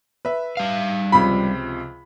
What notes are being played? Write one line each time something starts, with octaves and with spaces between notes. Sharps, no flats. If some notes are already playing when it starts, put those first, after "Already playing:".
B4 E5
G3 F5
C#2 C3 F3 B5